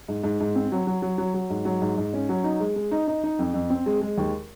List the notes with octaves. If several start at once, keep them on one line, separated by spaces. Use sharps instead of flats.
G#2
G#2
G#2
C4
F#3
F#3
F#3
F#3
F#3
G#2
F#3
G#2
G#2
C#4
F#3
D#4
G#3
G#3
D#4
D#4
D#4
F2
F2
C4
G#3
G#3
D#2